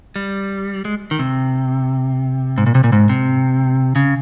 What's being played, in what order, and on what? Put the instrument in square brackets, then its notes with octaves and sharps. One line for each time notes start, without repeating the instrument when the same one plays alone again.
[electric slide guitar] G3
G#3
D#3
C3
G#2
A#2
C3
A#2
G#2
C3
C#3